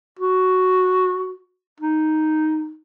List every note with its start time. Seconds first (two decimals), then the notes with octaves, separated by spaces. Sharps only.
0.19 F#4
1.80 D#4